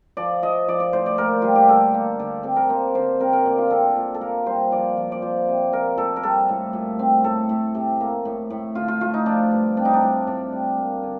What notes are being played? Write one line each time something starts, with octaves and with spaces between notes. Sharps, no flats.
F3 D5
F3 D#5
F3 D5
D5
A2 C5
D5
A#2 A#4
G3 F4
G4
D3 A4
A#3
D3
C4 A4
A#4
A#3 C5
D3 C5
C4 A#4
A#4
A#2 D5
F4
C4 A4
A#2
A4
A#3 A#4
G3 C5
F3 D5
F3
D5
F3 C5
C3
A#3 A#4
A#2 A4
A#4
G3 A4
A2
A#2
C4
A2 A4
A2
C3
A#3
A2
A2
D3 F4
F4
A3 F4
D#4
F3 D4
G2
C4 D4
D#4
D4
A2
A2 D4
G3
A#3
D3